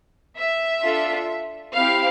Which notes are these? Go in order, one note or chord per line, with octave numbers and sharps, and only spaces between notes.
E5
D4 F4 A4
C4 E4 G4 F5